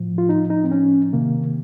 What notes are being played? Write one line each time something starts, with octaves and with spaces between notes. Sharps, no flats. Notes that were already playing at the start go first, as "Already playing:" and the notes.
Already playing: A2 F3
F4
D#4
D#4
C4
C#4
C3 D#3 A#3